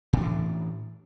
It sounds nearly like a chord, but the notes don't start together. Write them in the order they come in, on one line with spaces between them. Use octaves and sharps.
A2 D4 E3